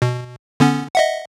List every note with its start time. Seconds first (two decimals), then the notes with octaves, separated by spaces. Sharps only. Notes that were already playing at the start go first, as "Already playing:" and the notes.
0.02 B2
0.60 D3 B3 C#4
0.95 D#5 E5 F#5